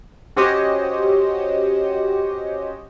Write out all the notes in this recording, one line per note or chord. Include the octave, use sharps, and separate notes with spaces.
C#4 F#4 G4 C5 C#5 D#5